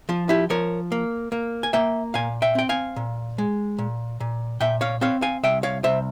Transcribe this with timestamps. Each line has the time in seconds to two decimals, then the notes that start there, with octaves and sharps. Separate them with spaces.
0.09 F3 F4
0.29 E4 G4
0.50 F3 A#4 C#5
0.92 A#3
1.32 A#3
1.63 G#5
1.73 A#3 E5 G5
2.14 A#2 F5 G#5
2.42 E5 G5
2.55 C4 G5
2.69 F5 G#5
2.96 A#2
3.38 G#3
3.78 A#2
4.20 A#2
4.60 A#2 E5 G5
4.81 C#5 F5
5.01 C4 C#5 F5
5.22 F5 G#5
5.43 C2 E5 G5
5.63 C#5 F5
5.84 C2 C5 E5